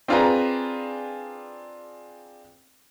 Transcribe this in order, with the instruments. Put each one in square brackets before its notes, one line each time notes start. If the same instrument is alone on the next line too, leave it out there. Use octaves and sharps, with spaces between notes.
[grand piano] C4 D4 F4 G#4 B4 A#5